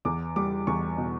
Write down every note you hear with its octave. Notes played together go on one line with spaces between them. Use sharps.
E2 D6
G3 D6
E2 C#6
B2